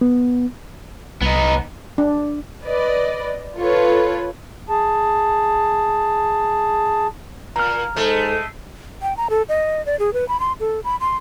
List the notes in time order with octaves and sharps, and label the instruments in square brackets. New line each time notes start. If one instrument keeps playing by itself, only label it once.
[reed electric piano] B3
[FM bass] C2 [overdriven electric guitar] B3 D#4
[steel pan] D4
[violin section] B4 D5 D#5
F4 A4 B4 C#5
[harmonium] G#4 A5
[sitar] A#2 [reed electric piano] A#5 F6
[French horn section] G#2 A4 [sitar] G#3 A3
[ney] G5
A#5
A4
D#5
D5
G#4
B4
B5
C6
A4
B5
C6